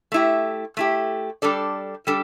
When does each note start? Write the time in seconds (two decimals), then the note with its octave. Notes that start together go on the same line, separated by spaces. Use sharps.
0.12 A3 E4 G4
0.77 A3 E4 G4
1.42 G3 D4 A4 D5
2.07 G3 D4 A4